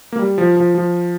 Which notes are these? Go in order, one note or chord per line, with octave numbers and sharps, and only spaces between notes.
A#3
G3
F3
F3
F3